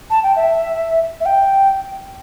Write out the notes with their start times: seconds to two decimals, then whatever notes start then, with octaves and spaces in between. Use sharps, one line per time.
0.10 A5
0.23 G5
0.36 E5
1.20 E5
1.25 G5